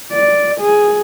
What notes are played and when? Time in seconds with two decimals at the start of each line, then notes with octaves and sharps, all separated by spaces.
0.12 D5
0.60 G#4